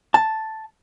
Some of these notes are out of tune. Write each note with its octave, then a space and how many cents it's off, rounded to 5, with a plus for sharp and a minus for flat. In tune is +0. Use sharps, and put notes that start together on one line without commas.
A5 +0